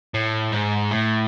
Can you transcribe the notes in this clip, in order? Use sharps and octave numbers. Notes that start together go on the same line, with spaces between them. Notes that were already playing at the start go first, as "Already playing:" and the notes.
A2
G#2
A2